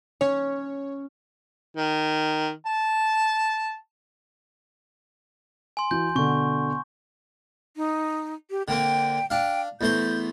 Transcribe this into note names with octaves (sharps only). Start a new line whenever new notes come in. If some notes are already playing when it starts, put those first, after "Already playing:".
C#4 C#5
D#3
A5
G#5 C6
E3 F#4 G6
B2 D3 G#5 C#6
D#4
G4
D3 A#3 C4 G5
D4 F5 G5
E2 A3 C5 G6